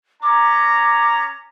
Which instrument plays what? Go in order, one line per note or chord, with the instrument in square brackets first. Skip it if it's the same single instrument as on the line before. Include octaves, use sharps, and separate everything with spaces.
[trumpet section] C#4 A#5 [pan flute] D6